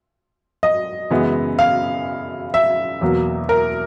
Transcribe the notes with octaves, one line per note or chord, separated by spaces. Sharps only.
D#5
F#2 C#3 E3 G#3 B3
F5
E5
E2 B2 F#3 A#3
A#4